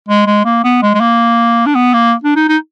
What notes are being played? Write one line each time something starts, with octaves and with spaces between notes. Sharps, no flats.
G#3
G#3
A#3
B3
G#3
G#3
A#3
D4
B3
A#3
D4
D#4
D#4